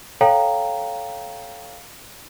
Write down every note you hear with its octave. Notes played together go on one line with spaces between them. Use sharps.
A4 C#5 F5 G5 A#5